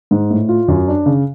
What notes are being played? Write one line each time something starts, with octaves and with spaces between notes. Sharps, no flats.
G#2
A2
F4
F#2
D4
C#3